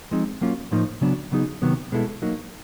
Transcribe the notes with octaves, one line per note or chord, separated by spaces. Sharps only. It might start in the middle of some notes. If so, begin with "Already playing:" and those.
F3 G#3 C4 D#4
F#3 A#3 C#4 F4
A2 F3 A#3 D#4
C#3 F#3 B3 D4
C#3 F#3 B3 D#4 G#4
C3 D#3 F#3 B3
B2 G#3 B3 E4 A4
F#3 A#3 D#4